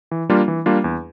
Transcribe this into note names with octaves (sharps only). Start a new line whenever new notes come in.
E3
G3 A#3 D4 F4
E3
G3 A#3 D4 F4
E2